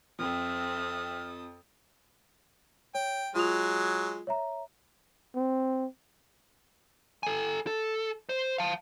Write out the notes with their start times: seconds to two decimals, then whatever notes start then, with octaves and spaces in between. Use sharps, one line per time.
0.19 F2 C4 A4 E5 D#6 F6
2.95 C#5 G5
3.35 F#3 G#3 F4 D#6 F7
4.27 C#5 E5 A#5
5.35 C4
7.23 A4 G#5
7.67 A4
8.29 C5
8.58 F5 A5